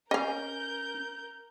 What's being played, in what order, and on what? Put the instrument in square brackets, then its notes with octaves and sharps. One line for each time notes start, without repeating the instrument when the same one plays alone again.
[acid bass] C#4 [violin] A#4 G6 [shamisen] D#5 F5